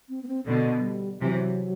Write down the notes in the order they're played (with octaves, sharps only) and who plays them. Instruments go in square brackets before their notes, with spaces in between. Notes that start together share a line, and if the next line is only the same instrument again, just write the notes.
[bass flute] C4
B3
C4
[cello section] B2 D3 [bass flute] B3
[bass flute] F#3
G3
[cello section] C3 E3 [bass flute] F#3